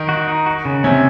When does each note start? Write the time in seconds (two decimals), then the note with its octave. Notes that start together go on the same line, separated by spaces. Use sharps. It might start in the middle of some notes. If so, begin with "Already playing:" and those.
Already playing: D#3
0.09 F#4
0.27 D#4
0.46 F#4
0.65 C#3
0.84 C3 C#4